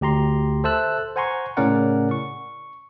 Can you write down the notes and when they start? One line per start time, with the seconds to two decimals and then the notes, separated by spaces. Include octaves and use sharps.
0.01 D2 G4 A#5 C6
0.64 A4 C5 E5 A5 E6 F#6
1.16 C5 F#5 G#5 A#5 C6 C#6
1.57 A2 C#3 C#4 A#4 D5 F#5
2.11 C#6